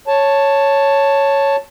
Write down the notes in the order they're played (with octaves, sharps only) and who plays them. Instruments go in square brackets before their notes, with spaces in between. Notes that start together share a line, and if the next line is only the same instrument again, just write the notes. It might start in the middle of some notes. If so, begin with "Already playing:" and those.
[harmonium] C#5 A5